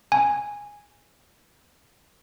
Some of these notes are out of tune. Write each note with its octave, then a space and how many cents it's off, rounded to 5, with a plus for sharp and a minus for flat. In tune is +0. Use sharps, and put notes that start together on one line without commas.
G#5 -10